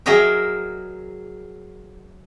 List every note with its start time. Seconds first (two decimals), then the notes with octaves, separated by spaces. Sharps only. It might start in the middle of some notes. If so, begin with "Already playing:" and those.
0.06 F#3 G#4 A#4 D#5 E5 G5